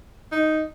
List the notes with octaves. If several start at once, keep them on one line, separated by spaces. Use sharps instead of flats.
D#4